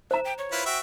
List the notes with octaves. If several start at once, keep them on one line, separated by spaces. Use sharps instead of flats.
C5 E5 A#5
G5
C#5
E4 F4 B4
F#4 E5 G5